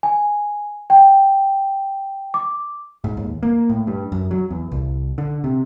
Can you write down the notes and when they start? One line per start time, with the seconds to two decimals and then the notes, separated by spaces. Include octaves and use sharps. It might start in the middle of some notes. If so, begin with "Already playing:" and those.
0.03 G#5
0.90 G5
2.34 D6
3.04 G#2
3.17 D#2
3.43 A#3
3.70 A2
3.87 G2
4.12 F#2
4.31 F#3
4.51 E2
4.72 C2
5.18 D3
5.44 C3